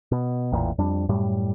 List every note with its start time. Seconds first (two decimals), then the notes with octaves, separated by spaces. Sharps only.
0.12 B2
0.52 A1 E2 A#2
0.78 F2 G3 D4
1.09 F#2 A2 G3